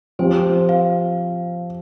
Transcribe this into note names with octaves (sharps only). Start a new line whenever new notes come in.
F3 C4 G4 C5
F5